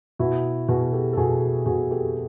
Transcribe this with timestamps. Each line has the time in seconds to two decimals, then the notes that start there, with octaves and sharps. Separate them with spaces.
0.19 B2 E4 F#4
0.69 B2 F#4 G#4
0.93 G4 A4
1.13 A4
1.17 B2 F#4 G#4
1.66 B2 F#4 G#4
1.91 G4 A4